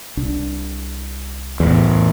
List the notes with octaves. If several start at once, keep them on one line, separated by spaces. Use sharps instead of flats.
C2 D4
E2 A2